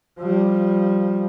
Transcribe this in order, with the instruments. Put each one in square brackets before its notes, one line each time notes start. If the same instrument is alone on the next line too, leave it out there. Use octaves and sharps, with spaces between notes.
[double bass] F3 G3